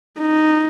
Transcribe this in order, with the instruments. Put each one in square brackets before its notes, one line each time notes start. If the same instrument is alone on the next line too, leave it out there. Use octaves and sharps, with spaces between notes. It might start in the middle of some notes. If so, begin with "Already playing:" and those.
[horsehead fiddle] D#4